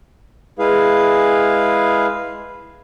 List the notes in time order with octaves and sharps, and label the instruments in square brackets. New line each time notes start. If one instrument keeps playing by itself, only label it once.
[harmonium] G#3 E4 G#4 B4 F5